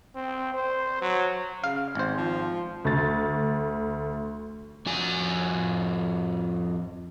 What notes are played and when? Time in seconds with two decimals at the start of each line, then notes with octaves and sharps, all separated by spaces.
0.15 C4
0.54 C5
1.02 F#3
1.64 C#3 F5
1.95 G#1 G#2 C5
2.17 F3
2.85 D2 A6
4.86 F2 F#4 G#5